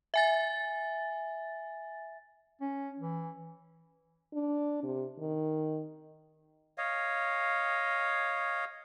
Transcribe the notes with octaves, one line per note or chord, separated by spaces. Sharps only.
E5 G#5 A6
C#4
E3
D4
C3
D#3
C#5 D#5 F5